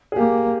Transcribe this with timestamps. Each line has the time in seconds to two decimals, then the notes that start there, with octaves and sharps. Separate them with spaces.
0.12 G#4
0.16 A#3 G4